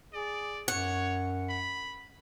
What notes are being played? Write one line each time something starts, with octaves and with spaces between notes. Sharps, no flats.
G#4 D5
F#2 C#5 F#5
B5